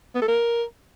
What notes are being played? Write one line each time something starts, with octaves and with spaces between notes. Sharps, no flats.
B3
A4
A#4